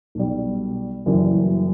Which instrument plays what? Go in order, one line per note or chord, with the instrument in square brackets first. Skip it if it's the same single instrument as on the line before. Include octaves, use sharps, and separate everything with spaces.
[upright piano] B1 B2 G3
F#1 F#2 E3 G3